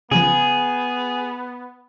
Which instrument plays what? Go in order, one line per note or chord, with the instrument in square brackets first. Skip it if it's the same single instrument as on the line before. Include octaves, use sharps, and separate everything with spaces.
[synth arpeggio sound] C#3 F3 [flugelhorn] B3 [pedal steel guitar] G#4